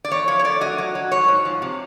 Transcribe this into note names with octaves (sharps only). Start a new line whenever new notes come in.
D5
E2 C#5
F3 C#5
C#5
A3 D5
F#3 D#5
F#3
F#3
G#2 C#5
G#2
F3
C3